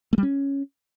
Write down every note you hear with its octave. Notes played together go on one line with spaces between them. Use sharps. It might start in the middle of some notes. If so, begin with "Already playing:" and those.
A3
G3
C#4